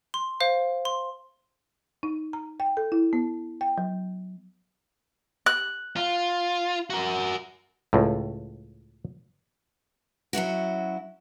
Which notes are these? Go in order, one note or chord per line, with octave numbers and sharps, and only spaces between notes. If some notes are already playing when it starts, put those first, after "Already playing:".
C6
C5 F5
C6
D#4
A#5
G5
A4
E4
B3
G5
F#3
F#6
F4
F#4 A#4
C#2 A2
F#3 C#4 E4 F#4